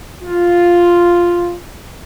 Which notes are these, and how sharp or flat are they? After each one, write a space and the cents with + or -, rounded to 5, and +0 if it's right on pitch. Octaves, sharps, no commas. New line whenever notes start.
F4 +0